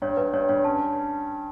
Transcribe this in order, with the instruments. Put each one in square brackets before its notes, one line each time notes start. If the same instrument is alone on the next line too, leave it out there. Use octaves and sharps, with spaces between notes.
[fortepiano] G2 [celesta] C#5
[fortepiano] G2 [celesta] B4
[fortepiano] G2 [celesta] C#5
[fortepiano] G2 [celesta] C#5
[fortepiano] C#4 [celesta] A5